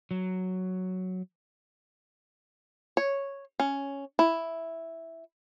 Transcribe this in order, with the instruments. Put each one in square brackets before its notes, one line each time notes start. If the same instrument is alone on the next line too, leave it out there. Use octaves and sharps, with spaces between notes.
[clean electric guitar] F#3
[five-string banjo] C#5
C#4
E4